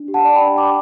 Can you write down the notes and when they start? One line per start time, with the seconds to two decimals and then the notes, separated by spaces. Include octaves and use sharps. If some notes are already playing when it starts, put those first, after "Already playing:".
Already playing: D4
0.08 G4
0.14 F#5 A5
0.24 D5
0.35 G5 B5
0.41 D4
0.58 D4 B5 D6